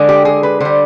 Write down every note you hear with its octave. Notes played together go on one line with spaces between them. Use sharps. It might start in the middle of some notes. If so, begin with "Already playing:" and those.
Already playing: D3 G#3
G4
G#4
B4
D3 G3 C5